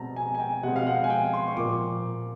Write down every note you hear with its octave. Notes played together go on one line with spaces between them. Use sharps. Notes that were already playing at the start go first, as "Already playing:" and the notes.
Already playing: B2 G#3 C4 A5 A#5
G#5
G#5
G5
B2 G#3 C4 F#5
F5
F#5
G#5
G5
C6
C#6
A#2 F3 A#3 D6